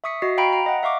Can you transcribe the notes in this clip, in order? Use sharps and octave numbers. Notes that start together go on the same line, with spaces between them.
E5 C#6 D#6 B6 C#7
F#4 D#5 C7
F5 G5 A#5 B5 D7
A#5
D#5 F#5
E5 F5 C#6 D6